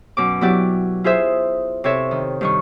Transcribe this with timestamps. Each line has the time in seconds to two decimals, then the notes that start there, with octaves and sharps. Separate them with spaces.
0.17 F#2 B2 D6
0.41 F#3 B3 E4 G4 D5
1.04 E4 F4 G#4 C5 E5
1.84 C3 A4 C#5 E5
2.11 D#3
2.41 G2 D#3 C#6